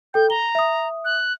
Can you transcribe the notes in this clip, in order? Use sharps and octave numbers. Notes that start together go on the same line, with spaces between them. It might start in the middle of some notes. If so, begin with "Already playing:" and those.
A4 G5 G6
A#5 G7
E5 D#6
F#6